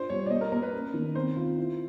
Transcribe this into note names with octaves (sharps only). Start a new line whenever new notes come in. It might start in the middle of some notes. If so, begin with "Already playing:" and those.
Already playing: D4 F4 C5
G3 C#5
D5
A#3 D#5
A#4
A#3 A#4
B4
C#4
D#3
C4 C5
F4
E4